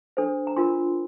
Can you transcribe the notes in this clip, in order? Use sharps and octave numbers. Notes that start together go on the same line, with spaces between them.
D4 A4 C5
A#5
D4 F4 A#4 C6